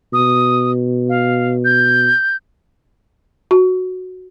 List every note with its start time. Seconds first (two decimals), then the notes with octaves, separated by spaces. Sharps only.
0.13 B2 D#6
1.09 F5
1.65 G6
3.51 F#4